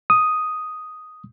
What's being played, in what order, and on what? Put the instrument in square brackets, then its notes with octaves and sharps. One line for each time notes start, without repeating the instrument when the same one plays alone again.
[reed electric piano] D#6